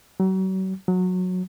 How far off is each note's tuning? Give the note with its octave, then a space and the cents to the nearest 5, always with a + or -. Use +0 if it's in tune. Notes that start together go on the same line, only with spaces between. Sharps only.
F#3 +40
F#3 -15